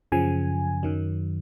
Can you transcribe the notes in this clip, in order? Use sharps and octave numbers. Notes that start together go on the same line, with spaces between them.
F#2 C#3 F3 G#5
F#2 D#3 F#3